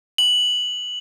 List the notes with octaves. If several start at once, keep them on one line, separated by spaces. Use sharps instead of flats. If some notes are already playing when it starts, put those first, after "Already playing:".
F#7